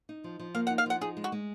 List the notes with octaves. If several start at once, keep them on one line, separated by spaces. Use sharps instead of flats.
D#4
F3
F3
A#3 F5
F#5
D#4
F5
F3 F#5
D#4 G#4
G#3
F#4
G#3